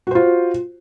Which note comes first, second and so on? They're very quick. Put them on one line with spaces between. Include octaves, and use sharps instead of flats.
F#4 C5 F4